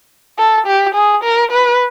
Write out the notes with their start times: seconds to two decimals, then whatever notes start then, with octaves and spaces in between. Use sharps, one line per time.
0.39 A4
0.67 G4
0.95 G#4
1.24 A#4
1.51 B4